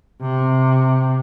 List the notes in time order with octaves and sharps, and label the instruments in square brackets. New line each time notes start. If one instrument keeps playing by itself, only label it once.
[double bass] C3